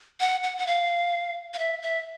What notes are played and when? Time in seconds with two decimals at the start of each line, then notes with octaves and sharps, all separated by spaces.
0.20 F#5
0.43 F#5
0.58 F#5
0.67 F5
1.54 F5
1.59 E5
1.82 E5